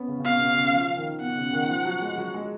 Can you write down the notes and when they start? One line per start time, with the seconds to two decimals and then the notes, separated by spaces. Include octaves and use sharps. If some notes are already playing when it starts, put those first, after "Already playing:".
Already playing: B3 C#4
0.08 C#3
0.20 C#3
0.24 B2 F5
0.40 B2
0.56 C#3
0.73 F3
0.97 D#3
1.21 B2 F#5
1.37 C#3
1.53 D#3
1.69 F3
1.85 F#3
2.02 G#3
2.18 F#3
2.34 G#3